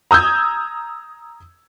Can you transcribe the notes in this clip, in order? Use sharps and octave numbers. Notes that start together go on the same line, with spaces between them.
A#5 D#6 E6 G6 G#6